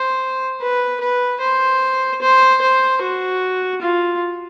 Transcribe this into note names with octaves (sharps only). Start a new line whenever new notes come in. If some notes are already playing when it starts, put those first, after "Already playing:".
Already playing: C5
B4
B4
C5
C5
C5
F#4
F4